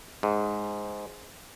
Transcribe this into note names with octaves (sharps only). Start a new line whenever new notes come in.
G#2